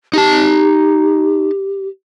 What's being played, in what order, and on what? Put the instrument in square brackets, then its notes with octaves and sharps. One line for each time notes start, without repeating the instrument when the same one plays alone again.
[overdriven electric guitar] D#4 A5 [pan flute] G4